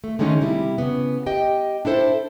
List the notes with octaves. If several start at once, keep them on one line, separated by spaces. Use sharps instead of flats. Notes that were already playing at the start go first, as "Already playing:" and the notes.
A3
D3 D#3 G#3 A3 C#4 D#4
C3 G3 E4
C#3 B3
G4 D#5 G5
D4 E4 A4 C5